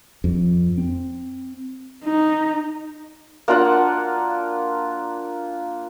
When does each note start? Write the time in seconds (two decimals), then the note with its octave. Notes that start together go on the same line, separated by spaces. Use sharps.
0.24 F2
0.78 C4
2.05 D#4
3.48 A#3 D4 F4 F#5